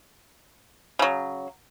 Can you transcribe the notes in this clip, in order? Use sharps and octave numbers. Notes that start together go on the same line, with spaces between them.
C#3 F#3